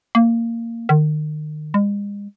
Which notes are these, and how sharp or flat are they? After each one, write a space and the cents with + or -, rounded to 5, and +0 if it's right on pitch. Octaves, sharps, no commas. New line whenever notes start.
A#3 -15
D#3 -35
G#3 -40